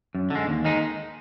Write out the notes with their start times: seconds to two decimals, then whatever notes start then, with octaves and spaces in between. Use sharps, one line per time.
0.15 F#2
0.30 D3 G#3
0.47 D#2
0.65 D#3 G#3 D#4